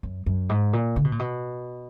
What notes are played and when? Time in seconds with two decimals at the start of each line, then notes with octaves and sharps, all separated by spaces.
0.03 F#2
0.26 F#2
0.49 G#2
0.73 A#2
0.96 D3
1.04 B2
1.12 A#2
1.19 B2